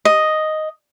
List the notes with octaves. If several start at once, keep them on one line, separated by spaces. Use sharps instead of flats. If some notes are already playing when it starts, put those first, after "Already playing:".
D#5